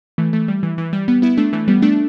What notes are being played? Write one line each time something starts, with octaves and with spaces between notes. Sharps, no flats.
E3 A3
E3 A3
G3
E3
E3
G3
G3 B3
B3 E4
A3 D4
E3 A3
G3 B3
A3 D4